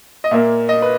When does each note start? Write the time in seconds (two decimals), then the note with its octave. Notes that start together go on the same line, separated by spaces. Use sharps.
0.24 D#5
0.31 A#2 A#3 E5
0.69 D#5
0.82 B4